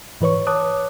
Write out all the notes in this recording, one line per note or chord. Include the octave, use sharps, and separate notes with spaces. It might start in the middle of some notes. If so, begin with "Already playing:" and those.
G#2 E3 B4 C#5 C#6
C#5 A5 D6 D#6 F#6